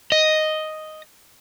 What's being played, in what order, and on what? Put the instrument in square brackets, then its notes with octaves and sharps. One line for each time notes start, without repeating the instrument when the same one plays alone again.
[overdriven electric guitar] D#5